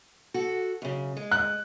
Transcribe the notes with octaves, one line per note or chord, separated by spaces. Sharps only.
F#4 A4
F#2 C#3
G#3
F#6